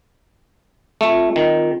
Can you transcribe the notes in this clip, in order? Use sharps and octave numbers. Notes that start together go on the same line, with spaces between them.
A3 C4 F4
D#3